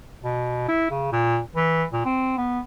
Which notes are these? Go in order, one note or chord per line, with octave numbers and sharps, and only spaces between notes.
B2
E4
C#3
A#2
E3
A#2
C4
B3